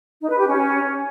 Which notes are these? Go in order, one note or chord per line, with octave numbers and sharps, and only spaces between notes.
D#4
B4
G4
C#4